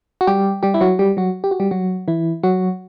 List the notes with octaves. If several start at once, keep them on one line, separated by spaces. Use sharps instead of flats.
F#4
G3 G4
G3 G4
E4
F#3 F#4
G3 G4
F#3 F#4
G4
F#4
G3 G4
F#3 F#4
E3 E4
F#3 F#4